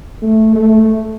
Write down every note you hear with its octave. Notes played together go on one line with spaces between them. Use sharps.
A3
A3